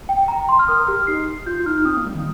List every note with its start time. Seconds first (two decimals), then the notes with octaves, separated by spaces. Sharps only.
0.09 G5
0.28 A#5
0.49 C6
0.59 F6
0.68 A#4 D#6
0.87 G4 F6
1.07 D#4 C7
1.46 F4 G6
1.59 F4
1.66 D#4 F6
1.77 D#4
1.85 C4 D#6
1.96 A#3
2.05 G3
2.15 D#3